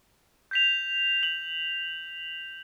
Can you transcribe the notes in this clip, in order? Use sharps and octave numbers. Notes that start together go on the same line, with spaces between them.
G6 B6 F7
F#7